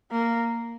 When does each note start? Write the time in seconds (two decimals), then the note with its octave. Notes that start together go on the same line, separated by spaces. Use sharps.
0.11 A#3